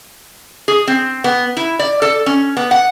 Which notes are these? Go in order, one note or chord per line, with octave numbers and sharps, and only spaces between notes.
G#4
C4
B3
E4
D5
A4
C#4
B3
F#5